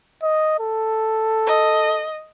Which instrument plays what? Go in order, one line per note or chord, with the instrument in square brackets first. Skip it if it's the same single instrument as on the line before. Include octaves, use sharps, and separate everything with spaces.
[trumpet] D#5
A4
[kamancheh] D#5